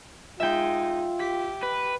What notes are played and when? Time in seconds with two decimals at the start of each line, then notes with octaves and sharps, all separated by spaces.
0.40 G#3 D#4 F4 E5 G5
1.19 G4 B6
1.63 B4